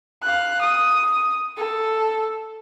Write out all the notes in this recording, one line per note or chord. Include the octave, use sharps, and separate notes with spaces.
F5 F#6
D#6
A4